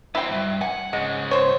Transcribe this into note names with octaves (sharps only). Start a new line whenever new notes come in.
F#3 C4 E4 G5
D2 G2
F#5 G#5
G#2 C#3 G#3
C5 C#5